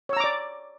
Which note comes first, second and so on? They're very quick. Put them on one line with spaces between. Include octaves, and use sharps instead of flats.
C#5 E6 A#5 D6 D5